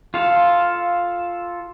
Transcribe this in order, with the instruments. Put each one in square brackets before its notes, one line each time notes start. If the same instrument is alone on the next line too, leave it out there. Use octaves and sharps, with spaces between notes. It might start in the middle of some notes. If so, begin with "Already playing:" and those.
[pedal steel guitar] F4 A4 F5